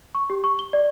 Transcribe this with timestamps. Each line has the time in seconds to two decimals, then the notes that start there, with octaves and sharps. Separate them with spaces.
0.15 C#6
0.30 G4
0.44 C#6
0.59 G7
0.73 D5